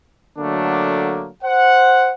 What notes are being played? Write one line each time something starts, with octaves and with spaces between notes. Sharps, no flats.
D3 F#3 A3 A#3 D4
C5 F#5